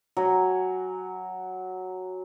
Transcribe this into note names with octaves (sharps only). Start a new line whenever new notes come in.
F#3 G#5